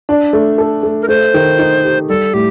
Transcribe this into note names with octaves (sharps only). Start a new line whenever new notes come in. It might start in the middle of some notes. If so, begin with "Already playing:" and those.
D4
A3
A4
A3
A#4
A3 C5
D#3
D#4
G4
G3 A4
A2 G4